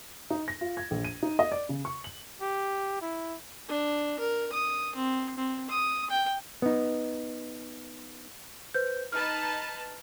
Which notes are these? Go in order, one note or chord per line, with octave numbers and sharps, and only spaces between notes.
D#4
A#6
F4
G#6
A#1
D#7
D#4
D#5
D5
C#3
C#6
F#7
G4
E4
D4
A#4
D#6
C4
C4
D#6
G5
B3 D#4
B4 C5 G6
D#4 B4 A5 F6